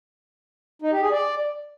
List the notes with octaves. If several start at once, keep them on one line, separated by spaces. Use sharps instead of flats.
D#4
G4
G#4
D5